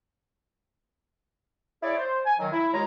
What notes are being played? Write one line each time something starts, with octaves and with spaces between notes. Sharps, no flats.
E4 G#4 C#5 D5
C5
G#5
D#3 F#3
E4
D#2 G#3 F4 C#5 A#5